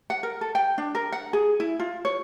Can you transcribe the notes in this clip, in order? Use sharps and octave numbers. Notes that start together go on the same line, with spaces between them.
F#5
A#4
A4
G5
D4
A#4
F#5
G#4
E4
F4
C#5